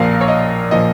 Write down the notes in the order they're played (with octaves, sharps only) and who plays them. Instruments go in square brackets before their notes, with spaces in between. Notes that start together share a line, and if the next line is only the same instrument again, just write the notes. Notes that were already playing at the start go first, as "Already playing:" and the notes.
Already playing: [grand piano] A#1 A#2 F3 A#4 F5
C#5
D#5
A#2 F3 D#5